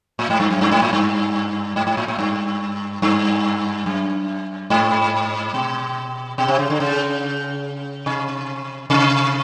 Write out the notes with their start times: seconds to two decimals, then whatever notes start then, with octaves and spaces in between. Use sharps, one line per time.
0.19 A2
0.30 G#2
0.40 G2
0.51 F#2
0.61 G2
0.71 G#2
0.82 A2
0.93 G2
1.76 G#2
1.87 G#2
1.97 A2
2.08 A2
2.19 G2
3.02 G2
3.86 F#2
4.70 G#2
5.54 B2
6.38 B2
6.48 C3
6.59 C#3
6.70 D3
6.80 C#3
8.06 C3
8.90 C3